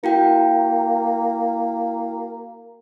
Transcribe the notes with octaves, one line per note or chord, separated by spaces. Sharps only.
A#3 E4 F#4 G5